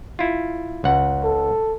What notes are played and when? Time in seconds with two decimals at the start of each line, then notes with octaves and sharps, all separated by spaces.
0.19 E4 F4
0.84 C#2 F#5
1.24 A4